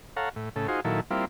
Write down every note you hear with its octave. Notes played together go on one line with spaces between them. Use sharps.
A4 C#5 F5 F#5 A#5
A2
A2 C#3 A4
D#4 F4 F#4 G#4 C5
A#2 D#3 F#3 E4 A4
G3 A#3 C4 E4 F4